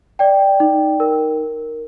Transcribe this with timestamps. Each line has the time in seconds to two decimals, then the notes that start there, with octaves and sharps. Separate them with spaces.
0.19 D5 G5
0.60 D#4
1.00 A#4